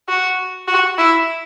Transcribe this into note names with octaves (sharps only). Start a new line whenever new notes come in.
F#4
F#4
E4